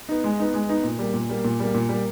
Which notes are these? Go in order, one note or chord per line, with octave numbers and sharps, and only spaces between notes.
B3 D#4
G#3
B3 D#4
G#3
B3 D#4
A#2
G3 A#3
A#2
G3 A#3
A#2
G3 A#3
A#2
G3 A#3